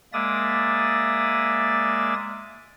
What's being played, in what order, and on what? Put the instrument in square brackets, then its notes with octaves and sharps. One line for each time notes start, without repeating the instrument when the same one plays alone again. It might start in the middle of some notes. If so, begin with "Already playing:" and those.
[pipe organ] G#3 A#3 D5 E5 D#6 A6